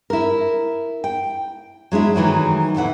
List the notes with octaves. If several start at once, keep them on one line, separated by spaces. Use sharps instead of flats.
E4 A#4
G5
F#3 G#3 D4 E4
D#3 E3 F#3 A3
D2 A#2 E3 F#5